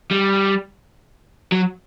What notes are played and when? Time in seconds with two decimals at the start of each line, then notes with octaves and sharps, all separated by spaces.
0.11 G3
1.52 F#3